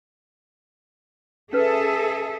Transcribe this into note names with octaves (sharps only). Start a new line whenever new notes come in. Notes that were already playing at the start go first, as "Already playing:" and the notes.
C#4 G#4 A4 B4 E5